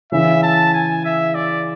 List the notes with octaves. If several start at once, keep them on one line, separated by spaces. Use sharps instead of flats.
C#3 E3 E5
A5
G#5
E5
D5